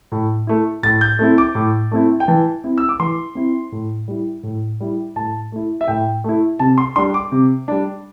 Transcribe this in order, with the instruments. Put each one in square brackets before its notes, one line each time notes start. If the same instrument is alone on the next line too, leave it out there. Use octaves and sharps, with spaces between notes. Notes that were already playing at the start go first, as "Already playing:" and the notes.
[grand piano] A2
A3 E4
A2 A6
G6
A3 C4 E4
D6
A2
A3 C4 E4
G5
E3 A5
C4 E4
E6
D6
E3 C6
C4 E4
A2
G3 E4
A2
G3 E4
A2 A5
A3 E4
E5
A2 G5
A3 E4
C3 A5
C6
G3 D4 C6
D6
C3
G3 D4